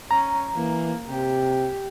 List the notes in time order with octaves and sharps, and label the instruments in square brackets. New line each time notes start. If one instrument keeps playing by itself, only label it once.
[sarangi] C#4 [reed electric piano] A#5
[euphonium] E3 [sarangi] A#3
[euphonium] C3 [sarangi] G4